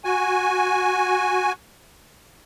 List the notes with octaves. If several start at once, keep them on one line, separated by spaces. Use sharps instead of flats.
F#4 G#5